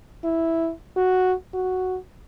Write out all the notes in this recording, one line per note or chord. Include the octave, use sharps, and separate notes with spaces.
E4
F#4
F#4